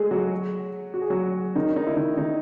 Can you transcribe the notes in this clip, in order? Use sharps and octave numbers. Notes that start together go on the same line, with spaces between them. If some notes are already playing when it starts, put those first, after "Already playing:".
Already playing: G#3 A3 G#4 A4
F#3 F#4
F#4
G#4
F#3 F#4
D#3 D#4
D#3 D#4
E4
D#3 D#4
D#3 D#4